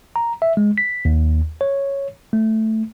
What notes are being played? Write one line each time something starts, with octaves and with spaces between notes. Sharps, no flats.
A#5
E5
G#3
B6
D#2
C#5
A3